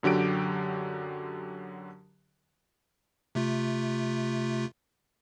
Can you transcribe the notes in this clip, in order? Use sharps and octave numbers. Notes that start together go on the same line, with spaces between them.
F#2 D3 F#3 G4 D7
C3 A3 F4